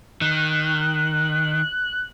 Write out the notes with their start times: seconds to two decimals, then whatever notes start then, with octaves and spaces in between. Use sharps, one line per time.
0.21 D#3 F#6